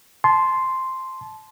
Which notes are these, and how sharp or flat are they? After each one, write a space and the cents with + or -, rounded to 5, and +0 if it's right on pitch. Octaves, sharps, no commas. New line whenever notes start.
A5 -20 C6 +0